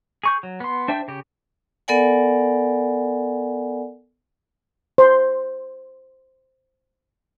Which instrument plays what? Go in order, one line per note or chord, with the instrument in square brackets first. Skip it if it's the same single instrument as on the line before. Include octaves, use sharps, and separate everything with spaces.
[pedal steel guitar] G#4 C#6 G6
F#3
B3 C6
D4 C5 E5 G5
C#3 G4
[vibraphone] B3 A4 A#4 D5 F#5 G#5
[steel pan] C5 C6